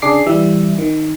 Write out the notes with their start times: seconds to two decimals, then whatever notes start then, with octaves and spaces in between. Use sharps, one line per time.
0.02 C#3 D4 G#4 D6 C7
0.26 E3 G3 E5
0.78 D#3